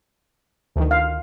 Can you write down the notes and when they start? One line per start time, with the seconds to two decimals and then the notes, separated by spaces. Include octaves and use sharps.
0.76 D2 D#3
0.91 F5